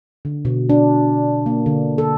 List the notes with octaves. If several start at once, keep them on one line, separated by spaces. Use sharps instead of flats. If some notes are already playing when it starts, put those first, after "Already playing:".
D3
B2
D4
A#3
D3
A4